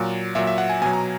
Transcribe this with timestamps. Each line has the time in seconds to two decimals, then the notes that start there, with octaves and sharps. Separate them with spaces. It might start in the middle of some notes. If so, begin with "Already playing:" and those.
Already playing: A#2 F#3
0.35 A#2 F#3 E5
0.47 E5
0.58 F#5
0.70 G#5
0.81 B2 G#5
0.86 F#3
0.93 A#5